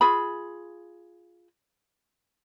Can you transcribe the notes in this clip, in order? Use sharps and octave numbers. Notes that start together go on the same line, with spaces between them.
F4 G#4 B5